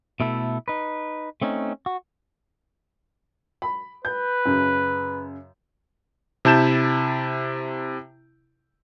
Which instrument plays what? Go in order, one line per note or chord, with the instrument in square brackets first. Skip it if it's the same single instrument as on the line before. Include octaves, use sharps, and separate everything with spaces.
[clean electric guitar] B2 A3 E4 A4
D#4 B4
A3 C4 C#4 D#4
F#4
[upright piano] B5
[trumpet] B4 [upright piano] G6
[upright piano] F#2 C#3
[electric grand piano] C3 E4 A5 G6 E7